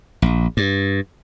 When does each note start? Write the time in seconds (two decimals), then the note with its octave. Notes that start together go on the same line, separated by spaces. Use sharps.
0.22 A#1
0.57 G2